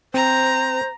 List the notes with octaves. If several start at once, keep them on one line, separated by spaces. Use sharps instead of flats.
C4 C5 A#5